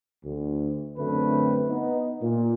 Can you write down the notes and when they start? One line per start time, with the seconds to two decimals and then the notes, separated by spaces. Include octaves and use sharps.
0.25 D2
0.97 A1 F#2 D3 A3 C4 B4
1.69 B3 D#4
2.22 A#2